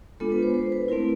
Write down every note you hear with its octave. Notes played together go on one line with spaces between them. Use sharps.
G#3 B3 D4 F4 A4
B4
C5
C5
B4
A3 C4 E4 A#4